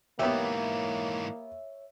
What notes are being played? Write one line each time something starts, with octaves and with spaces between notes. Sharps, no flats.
G#2 E3 A#3 B3 G4 C#5 E5